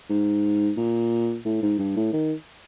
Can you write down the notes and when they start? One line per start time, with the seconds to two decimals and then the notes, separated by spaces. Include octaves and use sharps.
0.10 G#2
0.77 A#2
1.45 A2
1.62 G#2
1.78 G2
1.96 A2
2.13 D#3